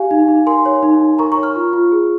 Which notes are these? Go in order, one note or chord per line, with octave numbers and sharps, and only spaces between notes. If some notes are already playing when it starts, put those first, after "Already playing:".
Already playing: G4 F5 G#5
D#4
D#4
A#4 G#5 C6
C#5
D#4
D#4
A#4 A#5 C#6
A#5 C#6
C#5
C#6 F6
F4
F4
G#4